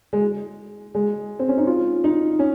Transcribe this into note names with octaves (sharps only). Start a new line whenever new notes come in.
G#3
G#3
C4
C#4
D#4
F4
D#4
C#4